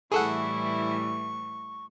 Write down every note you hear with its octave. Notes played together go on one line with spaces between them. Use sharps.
A2 E3 G3 E4 G#4 A4 F#5 C#6